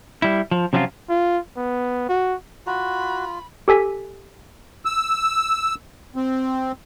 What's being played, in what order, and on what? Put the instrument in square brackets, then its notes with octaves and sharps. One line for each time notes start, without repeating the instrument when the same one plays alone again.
[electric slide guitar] G3 E4
F3
C3 F3 F#3 C#4 E4 F4
[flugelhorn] F4
B3
F#4
[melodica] F4 [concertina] F#4 [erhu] B5
[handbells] G4 A4 G#5 B6
[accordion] E6
C4